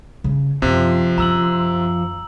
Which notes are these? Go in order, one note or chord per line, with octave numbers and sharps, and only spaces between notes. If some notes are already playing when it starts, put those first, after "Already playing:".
C#3
F#2 C3 F3 A#3
F#2 E4 A#5 E6 F#7